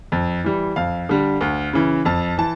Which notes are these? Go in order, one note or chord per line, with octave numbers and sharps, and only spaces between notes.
F2
E3 G3
F2 F5
D3 G3
D2
C#3 E3
F2 A5
E3 A5